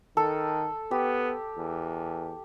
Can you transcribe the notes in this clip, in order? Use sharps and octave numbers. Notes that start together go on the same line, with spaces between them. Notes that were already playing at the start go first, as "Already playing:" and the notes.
D#3 A4
B3 G4
E2